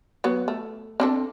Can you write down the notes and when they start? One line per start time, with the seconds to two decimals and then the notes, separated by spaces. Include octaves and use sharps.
0.24 F#3 B3
0.48 A3
1.00 C4 D4 A4